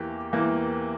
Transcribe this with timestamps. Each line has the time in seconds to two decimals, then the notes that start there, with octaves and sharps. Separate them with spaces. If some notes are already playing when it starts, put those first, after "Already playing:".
Already playing: E2 E3 A#3 G4
0.33 E2 E3 A#3